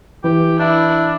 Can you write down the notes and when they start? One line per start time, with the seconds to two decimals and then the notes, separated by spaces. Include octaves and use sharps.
0.24 E3 G4
0.59 D4 E4